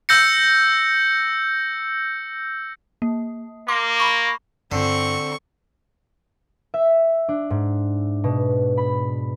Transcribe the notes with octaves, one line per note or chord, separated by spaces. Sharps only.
E6 G6 A#6 C#7
A#3
A#3 C6 D6
B5 C#6
G2 D3 C4 F4 C#6
E5
D4
G#2
B2
B5